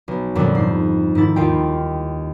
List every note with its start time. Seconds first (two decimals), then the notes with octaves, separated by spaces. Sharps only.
0.08 B1
0.35 F2 A#2 D3 F#3 G3
0.55 G#2 C7
1.15 G#2 D#3 E4 A6
1.36 D#2 D#3 F4 G5